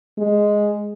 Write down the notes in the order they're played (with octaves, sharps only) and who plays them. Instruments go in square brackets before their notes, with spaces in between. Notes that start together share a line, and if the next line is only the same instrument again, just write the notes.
[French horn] G#3